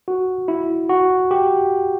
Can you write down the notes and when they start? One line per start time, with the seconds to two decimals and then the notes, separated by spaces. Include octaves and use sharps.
0.08 F#4
0.48 E4
0.89 F#4
1.31 G4